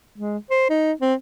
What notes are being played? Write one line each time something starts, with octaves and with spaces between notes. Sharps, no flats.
G#3
C5
D#4
C4